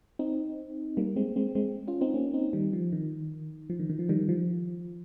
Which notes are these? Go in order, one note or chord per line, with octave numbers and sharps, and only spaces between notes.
C4 D#4
G3 A#3
G#3 C4
G#3 C4
G#3 C4
C#4 F4
C4 D#4
A#3 C#4
C4 D#4
D#3 G3
F3
D#3
F3
D#3
D#3
F3
D#3 G3
F3